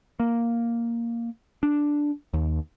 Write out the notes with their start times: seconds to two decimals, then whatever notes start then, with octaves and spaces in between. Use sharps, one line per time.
0.20 A#3
1.63 D4
2.34 D#2